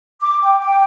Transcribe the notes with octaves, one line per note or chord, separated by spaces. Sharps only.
D6
G5
G5